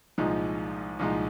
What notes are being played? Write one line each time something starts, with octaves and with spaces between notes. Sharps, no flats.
C2 A#2 F3 G#3 D#4
C2 A#2 F3 G#3 D#4